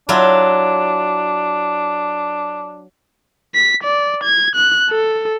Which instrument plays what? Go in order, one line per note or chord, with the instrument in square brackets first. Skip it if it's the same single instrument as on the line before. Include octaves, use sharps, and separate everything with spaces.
[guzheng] F#3 E4 F4 [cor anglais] D4
[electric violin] B6
D5
G#6
F#6
A4